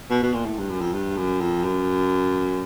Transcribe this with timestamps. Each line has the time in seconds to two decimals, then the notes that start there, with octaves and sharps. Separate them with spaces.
0.10 B2
0.23 B2
0.34 A#2
0.46 A2
0.58 G2
0.69 F#2
0.81 F2
0.93 G2
1.17 F#2
1.41 F2
1.64 F#2